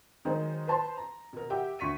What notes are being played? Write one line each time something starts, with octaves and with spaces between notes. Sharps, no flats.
D#3 F#3 G#3 D#4 A#4 C5
B4 C5 A5 B5 C6
A#5
B2 A#4
G4 E5 F#5 G5
D2 C#6 B6 D#7